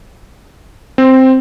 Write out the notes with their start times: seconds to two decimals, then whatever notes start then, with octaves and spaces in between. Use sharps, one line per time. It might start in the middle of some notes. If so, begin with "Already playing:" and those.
0.98 C4